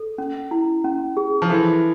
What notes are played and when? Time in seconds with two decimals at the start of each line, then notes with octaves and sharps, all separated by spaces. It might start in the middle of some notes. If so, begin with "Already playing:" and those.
Already playing: A4
0.18 C#4
0.51 E4
0.84 C#4
1.17 G#4
1.42 F3
1.50 E3 A4